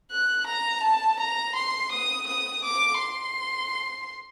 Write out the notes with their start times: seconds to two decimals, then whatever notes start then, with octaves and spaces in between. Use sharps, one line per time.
0.12 F#6
0.47 A#5
0.83 A5
1.20 A#5
1.56 C6
1.91 D#6
2.27 D#6
2.64 D6
2.99 C6